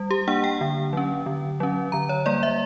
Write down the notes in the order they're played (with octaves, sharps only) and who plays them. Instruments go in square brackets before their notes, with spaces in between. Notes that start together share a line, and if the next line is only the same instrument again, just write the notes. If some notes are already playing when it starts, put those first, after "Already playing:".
Already playing: [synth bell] G3
G4
A#3 D4 F#5
G5
D3
F#3 C#4
D3
F#3 C#4
D3 A#5
C#5
G3 A#3 D5
E5